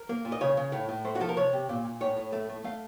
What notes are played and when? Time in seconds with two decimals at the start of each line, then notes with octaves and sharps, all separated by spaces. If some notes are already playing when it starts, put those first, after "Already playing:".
Already playing: A#4
0.09 A#3
0.25 A#2
0.32 D#5
0.41 C#3 C#5
0.57 C#3
0.72 A2
0.89 A2
1.05 A3 C5
1.15 F#4
1.20 F3 A4
1.29 A#4
1.36 C3 C#5
1.53 C3
1.69 A#2
1.85 A#2
2.01 A2 C#5
2.17 A2
2.32 A3
2.49 A3
2.64 A3 F5